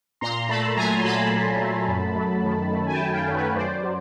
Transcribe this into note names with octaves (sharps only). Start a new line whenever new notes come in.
A#2 A#5 C6
A3 A5 B5
F#3 G#5 A#5
C6
A#2 A5 B5
A#2
A3
F#2
F#3
D#3
A3
G#5
G5 A5
F#2
F5 G5
F#3
B4 C#5
F#2 C5 D5
F#3